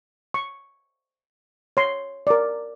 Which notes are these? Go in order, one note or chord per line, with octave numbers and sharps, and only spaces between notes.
C#6
C#5 C6
A#4 D5